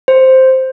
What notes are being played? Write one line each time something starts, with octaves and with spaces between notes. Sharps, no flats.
C5